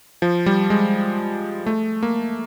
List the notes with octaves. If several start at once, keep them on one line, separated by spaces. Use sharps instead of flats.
F3
G3
G#3
A3
A#3